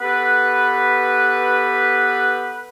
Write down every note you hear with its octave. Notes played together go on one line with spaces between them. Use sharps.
B3 G4 A4 B4